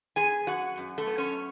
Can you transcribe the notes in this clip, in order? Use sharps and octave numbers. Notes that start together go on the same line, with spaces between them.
B3 G#4 G#5
F#2 F#4 F#5
F#2
A3 A4
B3
C#4 C#5